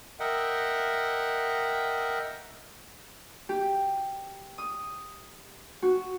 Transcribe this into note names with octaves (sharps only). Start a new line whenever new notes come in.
A#4 D#5 E5 F#5 G5
G4
D#6
F#4